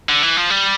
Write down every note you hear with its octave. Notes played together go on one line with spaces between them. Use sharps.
D3
E3
F3
G3